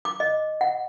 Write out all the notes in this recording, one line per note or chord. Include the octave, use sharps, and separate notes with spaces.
D6
D#5
F#5